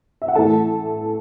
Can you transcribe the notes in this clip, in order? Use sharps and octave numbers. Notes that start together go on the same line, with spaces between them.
E5
F#5
A2 E3 A3 A4 A5